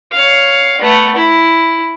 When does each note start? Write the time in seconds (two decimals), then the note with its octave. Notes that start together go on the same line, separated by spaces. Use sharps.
0.12 C#5 F5
0.81 A3 B3
1.15 E4